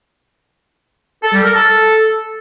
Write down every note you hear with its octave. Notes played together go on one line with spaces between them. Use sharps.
A4
G3
A#4
A4